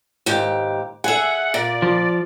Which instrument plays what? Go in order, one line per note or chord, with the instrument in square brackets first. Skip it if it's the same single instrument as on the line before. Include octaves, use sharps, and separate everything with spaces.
[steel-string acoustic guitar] D#2 G#2 G4
[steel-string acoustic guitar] G#4 E5 [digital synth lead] F#5
[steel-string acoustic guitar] A#2 [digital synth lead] D5
[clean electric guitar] F3